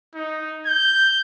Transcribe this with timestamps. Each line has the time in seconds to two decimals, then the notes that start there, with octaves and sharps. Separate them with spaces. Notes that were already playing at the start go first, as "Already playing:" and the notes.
0.15 D#4
0.66 G6